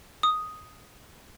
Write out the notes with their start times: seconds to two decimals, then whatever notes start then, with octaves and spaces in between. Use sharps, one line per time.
0.23 D#6